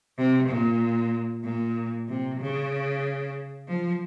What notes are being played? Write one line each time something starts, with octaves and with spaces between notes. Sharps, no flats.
C3
A#2
A#2
C3
C#3
F3